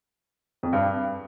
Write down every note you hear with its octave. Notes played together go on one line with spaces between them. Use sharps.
F2
G2